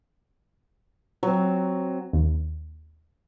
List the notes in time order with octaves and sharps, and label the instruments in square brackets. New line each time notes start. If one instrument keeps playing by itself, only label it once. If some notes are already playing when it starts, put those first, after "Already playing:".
[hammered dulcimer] F#3 C4
[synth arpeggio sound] D#2